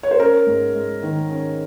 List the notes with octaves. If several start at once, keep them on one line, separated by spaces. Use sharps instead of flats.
C#5
C5
C#4 A#4
G#2
G#3
D#3
C#4